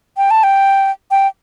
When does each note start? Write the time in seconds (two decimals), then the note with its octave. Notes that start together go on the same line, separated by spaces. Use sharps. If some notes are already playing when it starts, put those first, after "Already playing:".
0.17 G5
0.31 A5
0.43 G5
1.11 G5